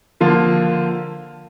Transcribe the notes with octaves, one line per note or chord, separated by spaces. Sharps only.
D3 F3 A#3 F4